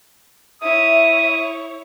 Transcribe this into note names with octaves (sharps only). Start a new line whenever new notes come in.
E4 C#5 E5 D#6